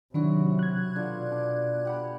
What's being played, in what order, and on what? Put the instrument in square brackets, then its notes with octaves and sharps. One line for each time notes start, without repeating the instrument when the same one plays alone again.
[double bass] C3 F#3 [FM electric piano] D#3 D4 [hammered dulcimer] E4 F#4
[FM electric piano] F#6 G#6
[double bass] B2 [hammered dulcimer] D3 F4
[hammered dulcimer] D4
G4 F#5 B5